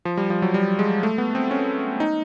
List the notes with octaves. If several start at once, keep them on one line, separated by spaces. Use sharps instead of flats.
F3
G3
F3
F#3
G3
G#3
A3
B3
C4
C#4
D#4